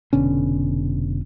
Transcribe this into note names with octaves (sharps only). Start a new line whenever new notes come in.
F1 B2 D3 C#4